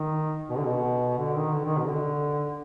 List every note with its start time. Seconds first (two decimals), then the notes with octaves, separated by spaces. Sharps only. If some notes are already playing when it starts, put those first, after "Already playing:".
Already playing: D#3
0.50 B2
0.57 D3
0.65 B2
1.18 D3
1.36 D#3
1.53 D3
1.64 D#3
1.77 B2
1.87 D3